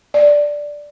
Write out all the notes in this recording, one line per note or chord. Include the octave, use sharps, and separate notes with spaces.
D5